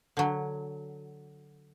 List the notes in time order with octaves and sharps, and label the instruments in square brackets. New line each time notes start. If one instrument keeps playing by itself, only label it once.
[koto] D3 F#3